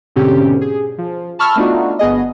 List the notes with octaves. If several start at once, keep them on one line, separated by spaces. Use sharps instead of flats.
G#2 B2 D3 C4 C#4 G4
G#4
F3
A5 B5 C#6 E6 F6
A3 B3 D4 D#4 F4 F#4
G1 B3 G#4 D#5